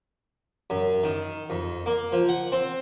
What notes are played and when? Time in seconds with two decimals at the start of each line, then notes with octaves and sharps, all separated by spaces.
0.70 F#2
1.04 D#3
1.50 F2
1.86 A#3
2.13 F3
2.29 F#5
2.52 C4